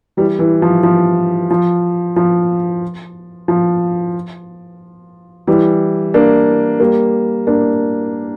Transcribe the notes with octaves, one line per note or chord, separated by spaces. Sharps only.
E3 G3
E3
F3
F3
F3
F3
F3
E3 G3
A#3 D4
G3 A#3
A#3 D4